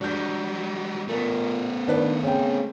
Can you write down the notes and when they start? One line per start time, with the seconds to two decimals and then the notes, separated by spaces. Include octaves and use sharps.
0.01 F#3 G3 D4 G6
1.08 A#2 A3 B3
1.88 D#3 D4 B4 D5
2.23 C#3 C4 G5